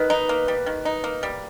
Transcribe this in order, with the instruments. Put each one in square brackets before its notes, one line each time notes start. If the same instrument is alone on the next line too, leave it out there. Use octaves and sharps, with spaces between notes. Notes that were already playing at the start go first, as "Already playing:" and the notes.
Already playing: [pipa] D#3 [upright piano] B4
[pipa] D#4
A#3
G3
D#3
D#4
A#3
G3